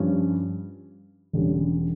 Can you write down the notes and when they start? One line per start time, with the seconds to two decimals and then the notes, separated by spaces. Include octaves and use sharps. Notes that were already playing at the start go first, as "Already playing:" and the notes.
Already playing: G2 F3 C#4
1.33 E1 E2 D3 G3 C#4